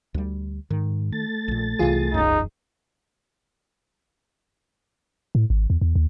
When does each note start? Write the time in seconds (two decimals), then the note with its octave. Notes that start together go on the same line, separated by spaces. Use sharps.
0.14 D2 G3
0.71 G#2 D#3
1.12 A3 A6
1.48 A#1 A#2
1.79 C2 C3 E3 F4 G#4
2.14 E1 F#2 D#4
5.35 A2
5.50 G#1
5.70 E2
5.81 E2
5.95 D#2